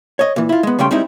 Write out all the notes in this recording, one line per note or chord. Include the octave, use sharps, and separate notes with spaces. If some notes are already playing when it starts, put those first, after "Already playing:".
C#5 D#5
A#2 E3
E4 F4
G#3 B3
C#3 G3 A3 C#4 G5 C6
G3 G#3 C4 D#4 E4